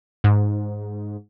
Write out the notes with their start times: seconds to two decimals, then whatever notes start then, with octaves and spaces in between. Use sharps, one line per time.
0.24 G#2